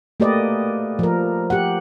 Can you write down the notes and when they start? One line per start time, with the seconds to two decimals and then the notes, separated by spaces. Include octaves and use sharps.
0.20 A3 A#3 G4 B4 D5 D#5
0.99 F3 A#4
1.50 G4 F#5